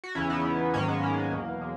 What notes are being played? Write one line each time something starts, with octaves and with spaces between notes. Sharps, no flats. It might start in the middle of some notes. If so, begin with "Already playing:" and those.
F#4
E2 C#3 E3 C#4 E4
B3 D#4
G#2 D#3 F#3 A#3 C#4
G#3 B3
A#3
E2 B2 F#3
G#3